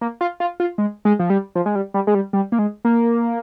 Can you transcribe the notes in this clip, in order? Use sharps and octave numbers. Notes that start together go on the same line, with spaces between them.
A#3
F4
F4
F4
G#3
G#3
F3
G3
F3
G#3
G3
G3
G#3
G3
G3
A#3
G#3
A#3